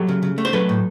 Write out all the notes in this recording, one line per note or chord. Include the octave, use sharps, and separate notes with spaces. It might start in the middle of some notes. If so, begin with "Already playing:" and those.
Already playing: F#3 G4 A4
C#3
C#3
A3
C5
F#3 A4 B4
A2